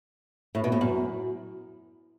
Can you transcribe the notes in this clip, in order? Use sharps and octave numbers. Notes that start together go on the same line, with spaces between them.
A2
B2
A2
F#2